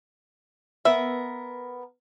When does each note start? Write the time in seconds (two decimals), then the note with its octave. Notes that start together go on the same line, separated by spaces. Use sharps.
0.85 B3 A#4 E5